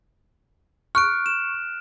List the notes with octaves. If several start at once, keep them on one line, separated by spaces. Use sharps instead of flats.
C#6 F6 F#6 D7
E7